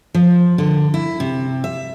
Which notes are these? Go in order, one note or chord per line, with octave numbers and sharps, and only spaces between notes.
F3
D3
E4
C3
E5